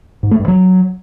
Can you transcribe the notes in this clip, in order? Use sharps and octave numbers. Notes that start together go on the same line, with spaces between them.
G#2
A3
G2
F#3